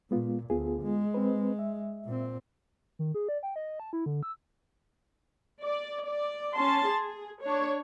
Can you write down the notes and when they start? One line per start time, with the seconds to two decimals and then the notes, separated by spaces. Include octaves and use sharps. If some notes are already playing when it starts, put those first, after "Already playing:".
0.11 A#2 G#3 B3 F4
0.50 D2 B3 F4 G#4
0.83 G#3
1.14 C4 B4
1.59 E5
2.05 A#2 C4
2.99 D#3
3.14 G#4
3.29 D5
3.43 G5
3.56 D#5
3.80 A5
3.93 E4
4.06 D3
4.23 E6
5.62 D5
6.04 D5
6.54 C#4 A5 C6
6.87 G#4
7.42 D4 C#5